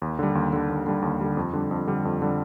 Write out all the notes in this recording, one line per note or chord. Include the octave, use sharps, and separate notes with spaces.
D#2
D3 G3
D#2
D3 G3
D#2
D3 G3
D#2
D3 G3
F2
D3 G3
F2
D3 G3
F2
D3 G3